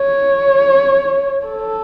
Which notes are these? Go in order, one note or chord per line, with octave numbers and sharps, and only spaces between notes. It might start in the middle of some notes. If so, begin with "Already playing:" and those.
Already playing: C#5
A4